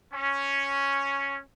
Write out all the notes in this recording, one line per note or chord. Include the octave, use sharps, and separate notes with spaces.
C#4